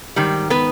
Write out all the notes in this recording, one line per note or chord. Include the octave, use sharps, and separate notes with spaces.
G#2 D#3 G3
B3 B4